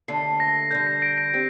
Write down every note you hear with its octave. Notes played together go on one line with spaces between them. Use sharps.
D#2 D3 A3 D4 A4 C7
A#6
D3 G3 D4 G6
C7
A#6 D7
A#6 D7
C4 G4